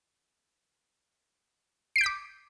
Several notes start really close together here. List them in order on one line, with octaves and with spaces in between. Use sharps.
C7 D7 G6 B6 D6